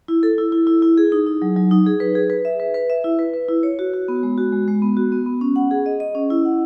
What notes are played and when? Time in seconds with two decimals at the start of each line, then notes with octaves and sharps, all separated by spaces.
0.08 E4
0.23 A4
0.38 E4
0.52 E4
0.67 E4
0.82 E4
0.98 G#4
1.12 D#4
1.27 D#4
1.42 F#3
1.56 F#3
1.71 D#4
1.86 G#4
2.00 B4
2.15 G#4
2.30 B4
2.45 E5
2.60 B4
2.74 B4
2.90 E5
3.04 E4
3.19 B4
3.34 B4
3.48 E4
3.63 C#5
3.79 F#4
3.94 F#4
4.08 B3
4.23 G#3
4.38 F#4
4.52 G#3
4.68 G#3
4.82 B3
4.97 F#4
5.12 B3
5.26 B3
5.41 C#4
5.56 F#5
5.71 G#4
5.86 D#5
6.00 D#5
6.15 C#4
6.30 E4
6.45 F#5